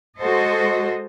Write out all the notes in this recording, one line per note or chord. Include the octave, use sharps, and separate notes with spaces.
G#3 F#4 A4 C5 D#5